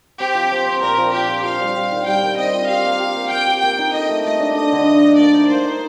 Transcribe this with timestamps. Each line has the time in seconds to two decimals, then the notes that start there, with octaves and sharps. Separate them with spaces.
0.20 C4 G4
0.35 F3
0.51 C4
0.67 C4
0.82 A#2 A#4
0.98 F3
1.13 F4 G4
1.29 F4
1.44 F4 F5
1.60 G3
1.75 G3
1.92 D#3
2.07 G3 G5
2.22 D#3
2.38 C4 D#5
2.54 F4
2.69 G4 F5
2.85 A#3
3.00 G4
3.15 A#3
3.31 A#3 G5
3.47 G4
3.63 A#3 G5
3.79 D#4
3.94 A4 D#5
4.09 A3
4.25 A3 D#5
4.40 D4
4.55 A4 D#5
4.72 D3
4.87 A3
5.02 A3
5.19 A#3 D5
5.34 D#4
5.49 A#3 C5
5.65 D#4